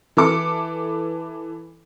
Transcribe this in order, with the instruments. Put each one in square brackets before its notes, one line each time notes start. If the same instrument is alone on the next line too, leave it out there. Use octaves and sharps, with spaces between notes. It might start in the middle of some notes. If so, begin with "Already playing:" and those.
[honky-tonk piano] E3 A4 D6 C#7